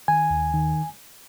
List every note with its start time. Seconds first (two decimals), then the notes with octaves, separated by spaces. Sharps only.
0.08 D#3 G#5
0.30 D#2
0.54 D#3